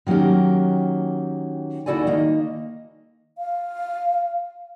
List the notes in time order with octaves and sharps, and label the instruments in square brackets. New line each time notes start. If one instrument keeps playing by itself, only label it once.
[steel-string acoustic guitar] D#3 F#3 A#3 C#4 G4
D#2 E4 F#4 A4 D5 G#5
D#3 A#3 D#5
[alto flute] F5